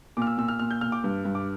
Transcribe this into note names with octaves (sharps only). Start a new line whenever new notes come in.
A#2 D6 F6
E6
A#2 E6
F6
A#2 F6
G6
A#2 F6
D6
G2
G2
D6